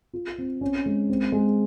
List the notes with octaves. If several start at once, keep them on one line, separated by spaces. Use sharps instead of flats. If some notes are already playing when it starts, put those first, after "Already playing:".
F4
C4
C#4
G#3
C4
G#3